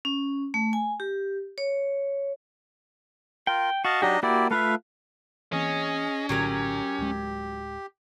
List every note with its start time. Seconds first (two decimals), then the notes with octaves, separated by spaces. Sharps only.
0.05 C#4
0.54 A3
0.73 G#5
1.00 G4
1.58 C#5
3.47 F4 A#4 G5
3.85 F#4 D#5 F5 A5
4.02 F#3 D4 D#4 F#4 G4 D#5
4.23 A#3 E4 F#4 G4 D5
4.51 A3 F4 B4 E5 F5
5.52 E3 A#3 C4 C#4 G#4 D#5
6.29 A#1 A2 D3 F#3 G4 G#4 A#4
6.99 D1 G#3